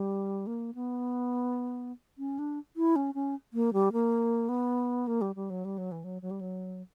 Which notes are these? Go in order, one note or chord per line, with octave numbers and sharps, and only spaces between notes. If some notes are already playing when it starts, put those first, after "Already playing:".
Already playing: G3
A#3
B3
C#4
D4
E4
C#4
C#4
A#3
G3
A#3
B3
A#3
G3
G3
F#3
G3
F#3
E3
F#3
F#3
G3
F#3